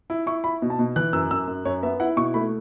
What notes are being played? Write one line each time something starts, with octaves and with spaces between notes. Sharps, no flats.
E4
E4 C#6
E4 B5
B2
A5
B2
E3 F#6
F#2 E6
F#2 E6
F#2
F#2 C#5
B3 E5
E4 F#5
B2 C#6
A3 B5